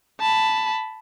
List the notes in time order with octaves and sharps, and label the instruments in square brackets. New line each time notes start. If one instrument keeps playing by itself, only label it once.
[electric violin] A5 B5